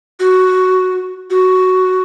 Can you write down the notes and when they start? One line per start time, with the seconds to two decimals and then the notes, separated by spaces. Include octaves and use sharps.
0.20 F#4
1.30 F#4